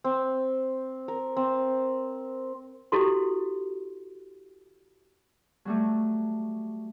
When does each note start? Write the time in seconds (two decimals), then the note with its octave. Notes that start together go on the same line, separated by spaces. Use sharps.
0.04 C4
1.08 A#4
1.37 C4
2.92 E4 F#4 G4 A4 C6
5.65 F#3 G3 A3